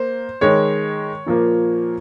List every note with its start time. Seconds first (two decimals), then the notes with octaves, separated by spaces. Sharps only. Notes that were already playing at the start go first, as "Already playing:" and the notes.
Already playing: A#3 C5
0.41 D#3 G#3 C#5
1.26 A#2 F3 A#3